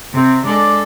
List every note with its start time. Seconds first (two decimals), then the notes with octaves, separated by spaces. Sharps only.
0.13 C3 C4
0.45 G#3 D4 A4 D5